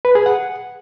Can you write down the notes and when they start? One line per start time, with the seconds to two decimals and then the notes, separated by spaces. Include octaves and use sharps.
0.05 B4
0.15 G#4
0.26 F#5